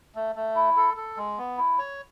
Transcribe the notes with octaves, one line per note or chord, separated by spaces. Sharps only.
A3
A3
E4
A4
A4
G#3
B3
E4
C#5